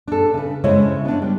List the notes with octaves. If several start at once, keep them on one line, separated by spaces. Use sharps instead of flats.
D4 A4
C#3 B4
C#3 G#3 E4 C5 C#5
B3 D4
G3